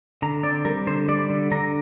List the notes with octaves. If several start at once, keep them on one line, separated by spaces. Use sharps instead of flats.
D3 A#5
C4 D5
G3 A#4
D3 C5
G3 D5
D3
D3 A#5